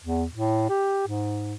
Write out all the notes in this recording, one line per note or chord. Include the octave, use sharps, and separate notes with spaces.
E2
A2
G4
G#2